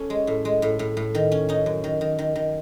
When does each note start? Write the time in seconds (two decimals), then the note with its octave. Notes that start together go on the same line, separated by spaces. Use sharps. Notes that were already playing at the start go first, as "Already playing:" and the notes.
Already playing: C#4 A4
0.10 G#3
0.27 A2
0.45 G#3
0.62 A2
0.79 A2
0.97 A2
1.15 D#3
1.32 C#4
1.49 C#4 D#4
1.66 F#2
1.84 D#3
2.01 D#3
2.19 D#3
2.36 D#3